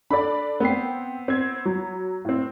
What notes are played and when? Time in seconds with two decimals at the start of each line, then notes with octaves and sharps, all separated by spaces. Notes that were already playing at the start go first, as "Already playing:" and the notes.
0.10 D4 A4 D5 B5
0.60 B3 C4 G5 C7
1.28 C4 G#6
1.65 F#3
2.25 A2 C4